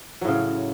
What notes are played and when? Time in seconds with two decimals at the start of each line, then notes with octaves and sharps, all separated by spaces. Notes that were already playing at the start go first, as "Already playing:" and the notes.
0.21 F#3
0.25 A2
0.28 C#3